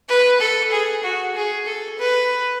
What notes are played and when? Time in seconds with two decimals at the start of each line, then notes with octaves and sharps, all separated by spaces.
0.08 B4
0.40 A4
0.72 G#4
1.03 F#4
1.35 G#4
1.66 A4
1.99 B4